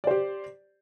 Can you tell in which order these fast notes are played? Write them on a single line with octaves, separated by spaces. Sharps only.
D5 C5 G4